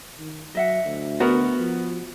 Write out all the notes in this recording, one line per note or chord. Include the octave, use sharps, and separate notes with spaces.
D#3
F#3 D#5 E5 F#5
D2
B3 F#4 A#4
F3